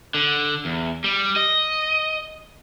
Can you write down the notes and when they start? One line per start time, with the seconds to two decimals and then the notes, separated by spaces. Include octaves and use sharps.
0.14 D3
0.65 E2
1.04 G3
1.36 D#5